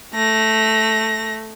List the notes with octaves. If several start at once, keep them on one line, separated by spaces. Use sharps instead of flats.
A3 A#6